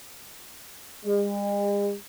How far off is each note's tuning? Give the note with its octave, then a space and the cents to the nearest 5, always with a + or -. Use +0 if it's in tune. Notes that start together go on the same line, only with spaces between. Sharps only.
G#3 -45